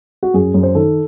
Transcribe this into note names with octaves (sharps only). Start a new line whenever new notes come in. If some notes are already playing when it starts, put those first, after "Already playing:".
F#4
F#2 G#4
F#2
C5
D#3 A4